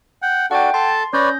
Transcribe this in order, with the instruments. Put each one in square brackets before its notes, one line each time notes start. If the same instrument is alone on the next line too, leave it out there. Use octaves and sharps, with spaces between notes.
[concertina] F#5 G5
[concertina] D4 F#4 A4 [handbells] F#5 G5
[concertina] A4 A5 [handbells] C6
[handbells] C#4 G6 A#6 [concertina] B4 C#5 D5